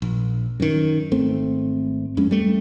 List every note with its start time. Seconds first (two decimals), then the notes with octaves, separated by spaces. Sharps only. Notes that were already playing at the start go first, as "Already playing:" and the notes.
0.02 A#1
0.60 F#2 D#3
1.12 G#1 A3 C4
2.17 F2 G#3 C#4
2.31 G3 A3